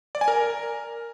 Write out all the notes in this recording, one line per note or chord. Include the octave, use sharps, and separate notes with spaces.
D5
G#5
A#4